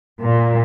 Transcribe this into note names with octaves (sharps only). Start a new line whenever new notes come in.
A#2